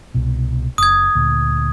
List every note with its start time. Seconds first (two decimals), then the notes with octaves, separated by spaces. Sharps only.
0.14 C2 B2
0.78 F#1 D#6 G#6
1.15 D2 A#2